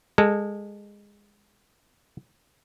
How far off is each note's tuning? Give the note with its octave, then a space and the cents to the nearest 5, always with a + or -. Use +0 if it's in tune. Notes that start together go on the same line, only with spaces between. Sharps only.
G#3 -20 A4 +0